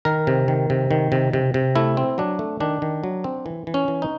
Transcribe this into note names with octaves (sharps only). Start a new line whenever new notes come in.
D#3 A#4
C3
D#3
C3
D#3
C3
C3
C3
A3 E4
C4
F#3 D4
A3
D#3 D4
D#3
F#3
C4
E3
E3
C#4
E3
D#4